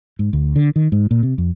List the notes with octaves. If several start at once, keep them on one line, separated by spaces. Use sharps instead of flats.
G#2
D2
D3
D#3
G#2
A#2
C3
F2